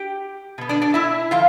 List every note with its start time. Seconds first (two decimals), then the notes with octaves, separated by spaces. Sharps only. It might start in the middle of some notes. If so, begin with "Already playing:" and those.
Already playing: G4 G5
0.58 B2 B3
0.69 D4 D5
0.82 D4 D5
0.94 E4 E5
1.31 A2 F3 F4 F5